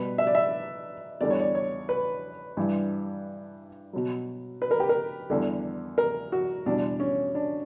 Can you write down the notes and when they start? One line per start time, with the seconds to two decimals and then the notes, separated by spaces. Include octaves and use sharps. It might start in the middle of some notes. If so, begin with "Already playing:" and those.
Already playing: B2 G3 B4
0.18 E5
0.27 D5
0.35 E5
1.21 E2 D3 G3 D5
1.30 C#5
1.40 D5
1.55 C#5
1.89 B4
2.57 G2 E3 G3
3.93 B2 F#3
4.62 B4
4.71 A#4
4.80 G4
4.89 A#4
5.30 E2 D3 G3
5.98 A#4
6.32 F#4
6.66 E2 B2 G3 D4
7.00 C#4
7.35 D4